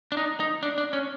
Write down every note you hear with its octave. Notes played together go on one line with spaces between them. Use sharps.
D4
D#4
D#4
D4
D4
C#4